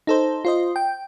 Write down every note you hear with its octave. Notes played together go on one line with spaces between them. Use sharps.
D#4 A4 C5
F4 C5 D#5
G5